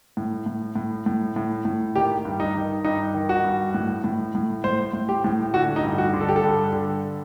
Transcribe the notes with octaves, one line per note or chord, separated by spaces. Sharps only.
A2
A2
A2
A2
A2
A2
D#3 G4
G2
D#4
D#3
G2 D#4
D#3
F#4
G2
A2
A2
A2
A2 C5
A2
G4
A2
D3 F#4
D#4
G2
F#4
D3
A4
G4
A4
G2
D3